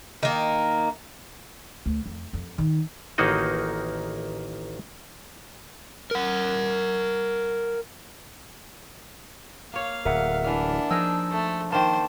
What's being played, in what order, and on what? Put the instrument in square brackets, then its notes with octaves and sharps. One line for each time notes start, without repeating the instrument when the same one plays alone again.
[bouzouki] D#3 A#3
[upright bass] D2
F2
F2
D#3
[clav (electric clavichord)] A1 D#3 A#3 D#4 F#4 D#5
[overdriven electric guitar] A#4 F#5
[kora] A#3 C#5 [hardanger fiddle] F5
[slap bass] D1 [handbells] A#4 E5 F#5
[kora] E3 F5 [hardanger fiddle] D4
[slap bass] F3 [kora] D#4 G#4 A#4 [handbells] E6
[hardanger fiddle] A3
[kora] D#3 A#3 [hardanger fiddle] C5 [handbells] A5